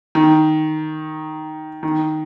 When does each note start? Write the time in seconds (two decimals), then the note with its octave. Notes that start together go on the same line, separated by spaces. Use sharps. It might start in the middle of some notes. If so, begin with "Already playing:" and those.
0.15 D#3
1.83 D#3